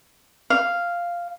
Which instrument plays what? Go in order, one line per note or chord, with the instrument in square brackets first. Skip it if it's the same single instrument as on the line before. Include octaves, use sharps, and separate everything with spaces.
[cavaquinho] F5